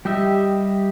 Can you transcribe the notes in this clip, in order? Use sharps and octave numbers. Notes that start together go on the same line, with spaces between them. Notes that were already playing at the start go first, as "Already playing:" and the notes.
G3 G4 D#5 E5